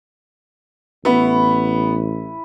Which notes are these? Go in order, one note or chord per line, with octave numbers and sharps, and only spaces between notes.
A1 B3 E4 B4 C#6